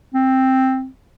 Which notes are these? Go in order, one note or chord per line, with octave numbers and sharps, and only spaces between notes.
C4